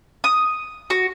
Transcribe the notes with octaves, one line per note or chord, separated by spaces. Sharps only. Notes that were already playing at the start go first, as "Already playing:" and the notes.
D#6
F#4